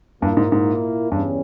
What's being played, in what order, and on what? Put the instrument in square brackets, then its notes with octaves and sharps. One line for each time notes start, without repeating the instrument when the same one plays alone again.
[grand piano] G2 [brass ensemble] A#2 A#3 E4
[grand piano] G#2
G#2
[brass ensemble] E2 C#3 G3 C#4 [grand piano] G2